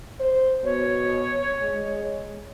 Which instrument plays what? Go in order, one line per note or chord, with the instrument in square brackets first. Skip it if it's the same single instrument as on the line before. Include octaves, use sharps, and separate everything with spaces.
[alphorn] C5
[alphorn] B2 [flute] C#5
[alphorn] G#3